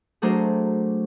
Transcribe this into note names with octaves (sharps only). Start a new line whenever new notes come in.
F#3 A3 D4 G#4 A#4 C5